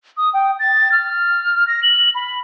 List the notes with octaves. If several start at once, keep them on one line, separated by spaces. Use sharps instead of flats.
D#6
G5
A6
F6
A#6
F#7
B5